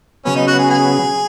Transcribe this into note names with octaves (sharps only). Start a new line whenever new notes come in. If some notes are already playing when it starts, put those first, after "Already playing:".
C#3 F#3 B3 C#4
D#4
F#4
G#4
G#4